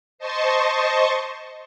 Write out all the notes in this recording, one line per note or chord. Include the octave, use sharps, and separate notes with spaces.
C5 D#5 A5 C6 C#6